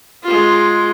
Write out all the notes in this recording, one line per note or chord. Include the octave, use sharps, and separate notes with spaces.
G#3 F4